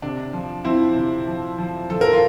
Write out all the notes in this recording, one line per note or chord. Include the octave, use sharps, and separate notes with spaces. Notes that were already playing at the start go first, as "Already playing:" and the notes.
C3 D4
F3
F3 C4 E4
C3
F3
F3
F3 A4
A#4
F4